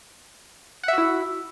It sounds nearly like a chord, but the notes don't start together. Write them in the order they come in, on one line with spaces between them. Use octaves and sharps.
F#5 E5 F#4 E4